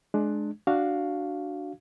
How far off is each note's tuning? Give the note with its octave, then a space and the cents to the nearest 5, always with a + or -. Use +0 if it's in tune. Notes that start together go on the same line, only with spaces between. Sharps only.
G#3 +25 D4 +15
D4 +0 F#4 +0 F5 +0